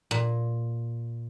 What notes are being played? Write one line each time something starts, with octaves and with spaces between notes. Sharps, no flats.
A#2